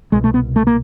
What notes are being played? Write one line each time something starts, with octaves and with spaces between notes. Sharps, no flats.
C2 B2 G#3
A3
B3
A3
A#3